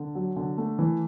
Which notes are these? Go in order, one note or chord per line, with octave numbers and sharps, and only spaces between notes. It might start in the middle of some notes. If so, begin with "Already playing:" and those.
Already playing: D3
F#3
D3
A3
E3